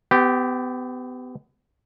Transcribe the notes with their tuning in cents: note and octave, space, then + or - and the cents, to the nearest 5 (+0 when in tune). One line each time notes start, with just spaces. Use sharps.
B3 +35 G4 -5